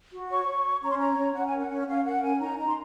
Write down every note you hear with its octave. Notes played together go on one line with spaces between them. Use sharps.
F#4
C#5 C#6
C#5
C#5
C#4 A#5
C6
C#5 A#5
C#4
C#4 F#5
G#5
A#4
F#5
C#4
C#4 F5
A#4 F#5
C#4 G#5
D#4 A#5
D#4 A#5
C6